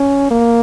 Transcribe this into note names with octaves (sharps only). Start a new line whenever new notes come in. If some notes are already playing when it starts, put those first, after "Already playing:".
Already playing: C#4
A#3